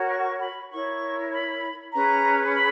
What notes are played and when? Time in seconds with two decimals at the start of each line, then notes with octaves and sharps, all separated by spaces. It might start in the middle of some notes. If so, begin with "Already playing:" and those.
Already playing: F#4 A#4 C#5
0.09 C#6
0.40 B5
0.70 E4 A#4 C#5 C#6
1.32 B5
1.92 C#4 G#4 B4 A#5
2.54 B5